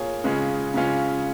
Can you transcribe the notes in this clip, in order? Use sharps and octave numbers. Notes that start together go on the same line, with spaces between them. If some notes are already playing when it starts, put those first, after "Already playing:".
Already playing: A#3 F4 G#4 C#5
C#3 G#3 C#4 F4
C#3 G#3 C#4 F4